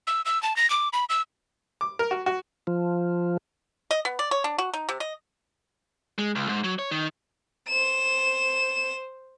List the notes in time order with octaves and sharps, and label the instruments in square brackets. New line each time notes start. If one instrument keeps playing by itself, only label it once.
[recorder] E6
E6
A5
A#6
D6
B5
E6
[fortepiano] D6
A#4
F#4
F#4
[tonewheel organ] F3
[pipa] D#5
B3
D5
C#5
D4
F#4
D#4
C3
D#5
[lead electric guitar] G#3
C#2
G#2
F#3
C#5
D#3
[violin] C5 E7